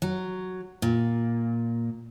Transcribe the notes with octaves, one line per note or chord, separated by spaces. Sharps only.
F#3
A#2